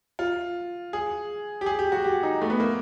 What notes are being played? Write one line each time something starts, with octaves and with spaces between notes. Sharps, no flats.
F4
G#4
G4
G#4
G4
F#4
G4
D#4
A3
B3
A#3